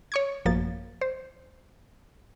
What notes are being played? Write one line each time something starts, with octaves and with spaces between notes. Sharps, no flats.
C#5 C#6 G#6
A1 F#2 F3 A#3 A6
C5